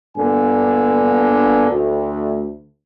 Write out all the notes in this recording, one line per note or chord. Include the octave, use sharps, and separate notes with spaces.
G2 A#2 D3 A#3 B3 G#5
D2